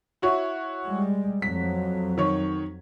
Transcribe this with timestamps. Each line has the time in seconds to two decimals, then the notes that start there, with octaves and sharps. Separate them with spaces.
0.22 E4 F#4 C#5
0.86 G3 G#3
1.42 F2 F#3 B6
2.18 D#3 C#5